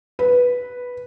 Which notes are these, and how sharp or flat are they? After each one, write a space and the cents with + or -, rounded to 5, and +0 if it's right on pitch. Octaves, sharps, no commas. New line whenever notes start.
B4 -5